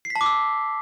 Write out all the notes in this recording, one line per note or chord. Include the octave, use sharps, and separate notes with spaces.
C7
B6
A5
D6
E6